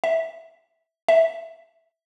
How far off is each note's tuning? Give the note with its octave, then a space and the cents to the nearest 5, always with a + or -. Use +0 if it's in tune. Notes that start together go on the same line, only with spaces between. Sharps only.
E5 -15
E5 -10